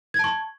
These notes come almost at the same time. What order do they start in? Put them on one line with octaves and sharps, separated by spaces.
G#6 A5 C#6